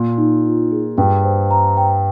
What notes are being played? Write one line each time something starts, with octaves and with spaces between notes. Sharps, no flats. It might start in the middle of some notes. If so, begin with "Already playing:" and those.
Already playing: A#2
D#4
F4
G#4
G2 G5
C5
A#5
G5